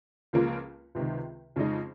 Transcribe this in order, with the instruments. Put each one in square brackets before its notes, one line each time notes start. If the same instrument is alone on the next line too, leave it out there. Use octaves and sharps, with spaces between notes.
[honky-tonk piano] C#2 C#3 F3 A#3 F4
C#2 C3 D#3
F2 C#3 G#3 D#4